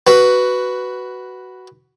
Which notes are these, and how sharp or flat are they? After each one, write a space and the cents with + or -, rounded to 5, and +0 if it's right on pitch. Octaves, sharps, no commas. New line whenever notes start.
F#4 +10 B4 +0